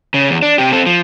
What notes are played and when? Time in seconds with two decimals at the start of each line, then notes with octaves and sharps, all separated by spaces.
0.14 C#3
0.30 E2
0.42 D4
0.58 C3 G4
0.73 C4 A4
0.86 F3